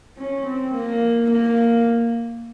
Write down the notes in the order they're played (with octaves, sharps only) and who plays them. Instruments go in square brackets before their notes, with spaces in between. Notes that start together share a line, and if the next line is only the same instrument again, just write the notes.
[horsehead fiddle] C#4
C4
A#3
A#3